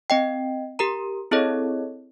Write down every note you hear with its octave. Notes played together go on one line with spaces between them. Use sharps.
C4 D#5 G5
G4 A#4 A#5
C4 E4 G#4 A4 C#5 D#5